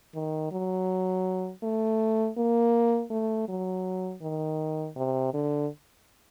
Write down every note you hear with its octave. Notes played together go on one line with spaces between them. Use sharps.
D#3
F#3
A3
A#3
A3
F#3
D#3
C3
D3